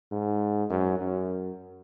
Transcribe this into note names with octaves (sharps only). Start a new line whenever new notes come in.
G#2
F#2
F#2